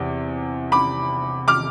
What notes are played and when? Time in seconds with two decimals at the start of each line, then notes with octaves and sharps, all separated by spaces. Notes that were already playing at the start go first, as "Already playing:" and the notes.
Already playing: E2 C3
0.72 B5 D6
1.48 D6 F6